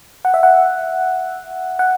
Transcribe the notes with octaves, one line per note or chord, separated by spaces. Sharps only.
F#5
E5
F#5
F#5